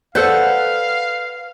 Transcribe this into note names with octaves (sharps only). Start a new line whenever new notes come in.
A4 B4 C5 D5 F5 F#5